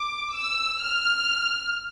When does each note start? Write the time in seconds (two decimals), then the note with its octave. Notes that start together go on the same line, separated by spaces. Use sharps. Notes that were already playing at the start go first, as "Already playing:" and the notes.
Already playing: D6
0.34 E6
0.82 F6